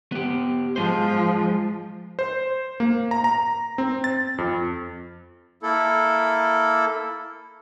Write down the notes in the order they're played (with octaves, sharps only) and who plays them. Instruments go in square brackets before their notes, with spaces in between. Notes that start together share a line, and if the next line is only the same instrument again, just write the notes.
[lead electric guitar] B3 G4
[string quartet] F3 [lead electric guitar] G#3 C5
[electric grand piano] C5
A#3
A#5
A#5
C4
A6
F2
[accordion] A#3 E4 A4